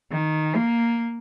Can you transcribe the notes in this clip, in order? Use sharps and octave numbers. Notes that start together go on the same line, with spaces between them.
D#3
A#3